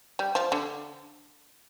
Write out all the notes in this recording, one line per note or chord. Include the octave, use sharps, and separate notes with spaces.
G3
F3
D3